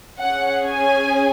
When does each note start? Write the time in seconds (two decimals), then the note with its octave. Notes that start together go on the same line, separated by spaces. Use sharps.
0.20 C#4 G#4 F#5
0.66 G#5